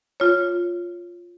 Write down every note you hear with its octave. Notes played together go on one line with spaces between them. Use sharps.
F4 C#5